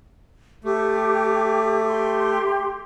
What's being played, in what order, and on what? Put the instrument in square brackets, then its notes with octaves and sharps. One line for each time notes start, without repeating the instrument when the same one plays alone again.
[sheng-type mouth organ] A3 [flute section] G4 D6
[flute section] G4 C6